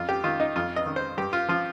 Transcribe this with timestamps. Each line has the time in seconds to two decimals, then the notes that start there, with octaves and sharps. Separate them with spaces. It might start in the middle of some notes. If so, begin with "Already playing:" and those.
Already playing: F2 F4
0.09 G4
0.24 D#3 F4
0.40 D#4
0.56 F2 F4
0.76 D#5
0.86 D#3
0.96 C5
1.18 G2 G4
1.33 F4
1.49 F3 F4